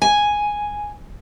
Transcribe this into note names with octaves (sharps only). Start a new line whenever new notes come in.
G#5